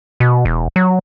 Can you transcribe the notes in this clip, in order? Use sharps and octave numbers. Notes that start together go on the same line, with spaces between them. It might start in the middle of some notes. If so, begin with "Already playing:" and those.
B2
E1
F#3